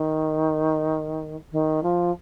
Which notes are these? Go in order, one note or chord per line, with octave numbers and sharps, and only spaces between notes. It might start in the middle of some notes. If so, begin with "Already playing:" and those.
Already playing: D#3
D#3
F3